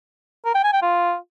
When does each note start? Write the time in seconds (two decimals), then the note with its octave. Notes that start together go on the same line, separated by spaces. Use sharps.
0.45 A#4
0.54 G5
0.64 G#5
0.73 G5
0.82 F4